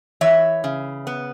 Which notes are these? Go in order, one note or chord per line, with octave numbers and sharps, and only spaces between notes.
E3 C#5 E5
C#3
B3